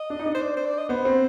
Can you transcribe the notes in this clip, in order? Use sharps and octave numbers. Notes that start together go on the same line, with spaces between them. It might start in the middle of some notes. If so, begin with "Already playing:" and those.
Already playing: D#5
D4
D#4
D4
C5
D5
C5
D5
D#5
B3 C5
C4